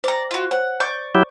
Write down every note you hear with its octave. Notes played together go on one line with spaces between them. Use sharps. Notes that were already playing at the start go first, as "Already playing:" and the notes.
C5 D5 G5 A#5
F4 F#4
C5 C#5 F#5
D5 C#6 G6
F#3 E4 G4